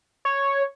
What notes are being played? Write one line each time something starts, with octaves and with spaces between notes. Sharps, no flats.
C#5